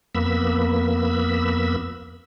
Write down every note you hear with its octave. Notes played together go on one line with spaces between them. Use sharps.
F2 A#3 B3 B5 E6